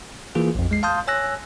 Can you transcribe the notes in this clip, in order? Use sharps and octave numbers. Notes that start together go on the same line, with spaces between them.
E3 A#3 F4 G#4
A#1 F2
G#3 C7
F5 A5 C6 D#6 G6
C#5 G#5 E6 F#6 A#6